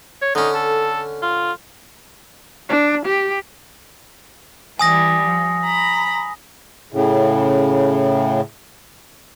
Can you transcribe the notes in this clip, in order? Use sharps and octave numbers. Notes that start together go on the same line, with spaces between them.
C#5
D3 C#4 D#4
A4
F4
D4
G4
E3 G3 G#5 D#6 A#6
F3
A#5 B5
A2 C#3